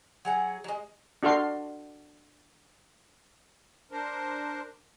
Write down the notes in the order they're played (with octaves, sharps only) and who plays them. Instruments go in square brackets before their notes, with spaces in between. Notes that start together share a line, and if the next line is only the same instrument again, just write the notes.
[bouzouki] F#3 G#4 F#5
F#3 G#3
[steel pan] D4 F#4 A4 F5 C6
[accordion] D4 A#4 C5